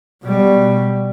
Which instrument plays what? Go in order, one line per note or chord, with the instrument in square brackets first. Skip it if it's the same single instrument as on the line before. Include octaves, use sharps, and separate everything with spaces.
[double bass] B2 G3